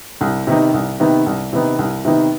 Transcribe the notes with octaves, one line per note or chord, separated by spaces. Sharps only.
C2
C3 D#3 B3 D#4
C2
C3 D#3 B3 D#4
C2
C3 D#3 B3 D#4
C2
C3 D#3 B3 D#4